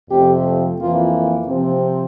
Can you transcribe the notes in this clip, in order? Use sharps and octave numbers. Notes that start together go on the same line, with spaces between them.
F2 C3 F3 A3 C4 G4
F2 E3 A#3 F4
C3 F3 C4